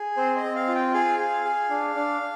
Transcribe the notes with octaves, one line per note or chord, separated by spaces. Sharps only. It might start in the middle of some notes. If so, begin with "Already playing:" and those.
Already playing: G#4
C4 C5
D#5
C4
F5
F4
G5
G#4 F5
G#4
G#4
D4
D4